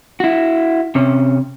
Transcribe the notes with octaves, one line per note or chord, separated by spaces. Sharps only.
E4 F#4
C3 C#4